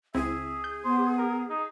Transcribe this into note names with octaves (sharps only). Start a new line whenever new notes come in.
C#2 C4 E4 G#4 E5
G6
B3 C5
A#4
D#4